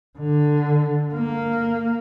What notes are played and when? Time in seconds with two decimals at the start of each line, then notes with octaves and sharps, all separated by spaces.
0.18 D3
1.13 A#3